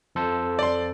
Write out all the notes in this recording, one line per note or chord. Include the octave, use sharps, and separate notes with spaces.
F2 A4 C5
D5 C6